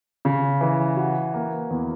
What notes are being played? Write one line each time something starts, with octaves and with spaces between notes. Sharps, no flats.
C#3
E3
F#4
A#3
E2